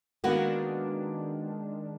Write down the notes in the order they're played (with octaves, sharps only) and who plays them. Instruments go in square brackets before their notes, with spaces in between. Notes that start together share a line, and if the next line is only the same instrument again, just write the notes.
[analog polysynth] D#3 G#3 D4 [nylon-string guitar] A#3 B3 F#4